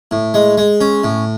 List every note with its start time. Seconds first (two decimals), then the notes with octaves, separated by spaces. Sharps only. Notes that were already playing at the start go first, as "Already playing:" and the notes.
0.11 A2
0.34 G#3
0.58 G#3
0.81 C#4
1.04 A2